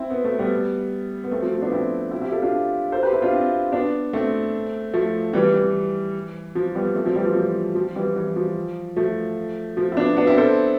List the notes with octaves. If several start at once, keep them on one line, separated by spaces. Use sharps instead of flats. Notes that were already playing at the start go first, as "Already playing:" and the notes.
Already playing: C4 E4
B3
A3
G3 B3
B3
A3 C4
F3
F3
B3 D4
C4 E4
C4 E4
E4 G4
F4 A4
D4 F4
A4 C5
G4 B4
E4 G4
D4 F4
C4 E4
B3 D4
A3 C4
F3 A3
E3 G3
E3
F3
G3 B3
A3 C4
F3 A3
E3 G3
F3
F3
F3
E3 G3
E3
F3
F3 A3
F3
E4
B3 D4
B3 D4
C4 E4
A4 C5